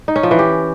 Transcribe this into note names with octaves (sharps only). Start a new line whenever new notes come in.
D#4
C#4
F3
E3
G4